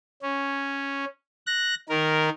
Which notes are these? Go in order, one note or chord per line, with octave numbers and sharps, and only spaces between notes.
C#4
F#6 A#6
D#3 A#4